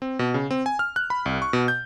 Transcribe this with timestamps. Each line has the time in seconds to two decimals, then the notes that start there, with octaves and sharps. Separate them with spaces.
0.02 C4
0.19 B2
0.34 C#3
0.51 C4
0.66 G#5
0.79 F6
0.96 F#6
1.10 B5
1.26 C2
1.42 C#6
1.53 B2
1.68 G6